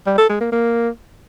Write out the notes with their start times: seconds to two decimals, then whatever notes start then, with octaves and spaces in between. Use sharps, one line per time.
0.06 G3
0.18 A4
0.29 G#3
0.41 A#3
0.52 A#3